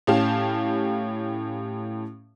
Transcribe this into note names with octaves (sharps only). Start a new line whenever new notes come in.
A2 C#4 G4 F5 A5